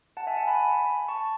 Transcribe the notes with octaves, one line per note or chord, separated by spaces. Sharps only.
F#5 A5
E5 G#5
F#5 A5
G#5 B5
A5 C#6